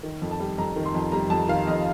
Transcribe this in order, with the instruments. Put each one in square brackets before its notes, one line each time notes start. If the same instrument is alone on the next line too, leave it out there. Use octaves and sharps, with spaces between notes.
[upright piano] D#3
F2
A5
G3
F2 A#5
D#3
C6
F2
G3 A#5
F2 A5
D#3 F5
F2 D#5